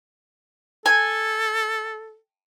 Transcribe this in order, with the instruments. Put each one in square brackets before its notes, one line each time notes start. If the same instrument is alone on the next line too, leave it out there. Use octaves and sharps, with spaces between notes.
[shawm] A4 [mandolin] G#5